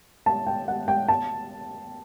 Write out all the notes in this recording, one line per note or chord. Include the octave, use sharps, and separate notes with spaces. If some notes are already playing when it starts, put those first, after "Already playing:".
A5
G5
F#5
G5
A5